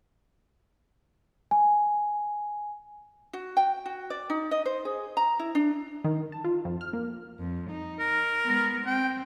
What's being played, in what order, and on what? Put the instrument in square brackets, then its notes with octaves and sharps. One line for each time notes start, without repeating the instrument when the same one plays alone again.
[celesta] G#5
[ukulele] F#4
G5
F#4
D5
D#4
D#5
C5
G#4
A#5
E4
D4
[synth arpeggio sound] D#3
A5
F4
F2
F6
A#3
[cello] F2
D#4
[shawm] A#4
[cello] G#3 B3
[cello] C4 [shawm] G5